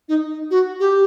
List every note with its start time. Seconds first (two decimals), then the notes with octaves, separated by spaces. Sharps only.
0.08 D#4
0.51 F#4
0.80 G4